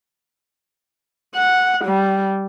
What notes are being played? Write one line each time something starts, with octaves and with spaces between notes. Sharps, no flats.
F#5
G3